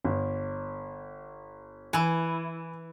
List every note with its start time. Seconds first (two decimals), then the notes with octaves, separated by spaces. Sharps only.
0.05 G1
1.93 E3 E4 G#5